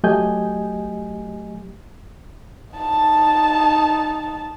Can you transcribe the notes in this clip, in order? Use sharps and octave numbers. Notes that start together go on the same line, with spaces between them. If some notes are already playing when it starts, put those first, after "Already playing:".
F#3 A3 G4 D#5 G#5 G6
D#4 A5